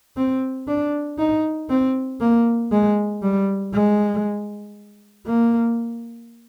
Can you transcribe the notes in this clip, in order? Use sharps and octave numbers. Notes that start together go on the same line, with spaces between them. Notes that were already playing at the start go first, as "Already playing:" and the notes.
C4
D4
D#4
C4
A#3
G#3
G3
G#3
A#3